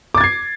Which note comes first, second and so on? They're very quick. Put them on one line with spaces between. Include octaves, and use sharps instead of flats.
D6 A6 G#6 C7